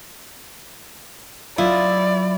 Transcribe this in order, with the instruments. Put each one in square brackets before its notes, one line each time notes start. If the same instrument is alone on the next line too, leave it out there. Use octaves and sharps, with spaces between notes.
[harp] F#3 [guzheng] E4 [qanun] F4 D#5 [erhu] D5